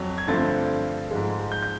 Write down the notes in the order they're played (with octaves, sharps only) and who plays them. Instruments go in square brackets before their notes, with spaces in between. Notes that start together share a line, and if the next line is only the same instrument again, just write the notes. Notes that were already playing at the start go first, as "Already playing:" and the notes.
Already playing: [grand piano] F2 F#3
G#6
G2 D3 F3 A3 C4 A6
G#2 F3 G#3
G6
G6